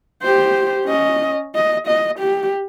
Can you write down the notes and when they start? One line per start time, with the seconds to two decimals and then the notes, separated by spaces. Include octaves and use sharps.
0.22 G4 C5
0.86 C#4 D#5
1.55 D#5
1.87 D#5
2.19 G4